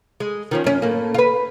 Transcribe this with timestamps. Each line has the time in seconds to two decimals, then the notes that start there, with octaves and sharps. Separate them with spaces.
0.20 G#3
0.51 D#3 F3 C#4
0.64 F#2 C#4
0.82 A2 A#3
1.14 F4 B4